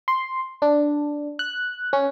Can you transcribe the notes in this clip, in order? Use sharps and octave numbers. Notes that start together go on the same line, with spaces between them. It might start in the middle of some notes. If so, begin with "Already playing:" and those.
C6
D4
F#6
C#4